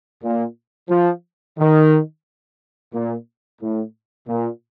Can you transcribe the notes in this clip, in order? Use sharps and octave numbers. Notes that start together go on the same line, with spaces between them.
A#2
F3
D#3
A#2
A2
A#2